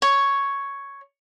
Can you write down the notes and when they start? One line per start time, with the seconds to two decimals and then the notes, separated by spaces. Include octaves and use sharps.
0.02 C#5